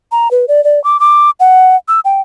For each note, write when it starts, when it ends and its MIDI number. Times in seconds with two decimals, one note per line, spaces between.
0.12 0.31 82
0.31 0.46 71
0.48 0.63 74
0.64 0.82 74
0.84 1.00 86
1.00 1.30 86
1.40 1.76 78
1.88 2.00 88
2.05 2.21 79